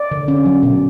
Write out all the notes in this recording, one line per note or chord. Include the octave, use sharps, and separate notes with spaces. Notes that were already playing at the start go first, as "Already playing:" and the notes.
Already playing: D5
D3
C#4
F#3
B2